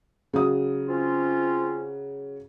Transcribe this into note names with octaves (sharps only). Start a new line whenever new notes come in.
C#3 F#3 D#6
C4 C#4 F4